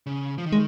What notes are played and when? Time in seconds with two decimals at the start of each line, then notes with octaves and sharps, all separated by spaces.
0.06 C#3
0.38 F3
0.46 D#3
0.52 G#3